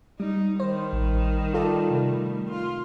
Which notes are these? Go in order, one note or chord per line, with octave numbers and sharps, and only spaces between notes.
G3 D#4
D#3 G3 C5
A1
F4 A4 D5
C3 A3
F4